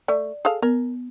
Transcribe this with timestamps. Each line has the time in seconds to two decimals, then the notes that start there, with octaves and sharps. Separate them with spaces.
0.08 A3 D5
0.45 G#4 A4 F5
0.62 B3 A#4